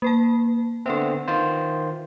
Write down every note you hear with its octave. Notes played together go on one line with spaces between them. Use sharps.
A#3 B4 A5
D3 B3 C4 B4 E5
D#3 F4 C5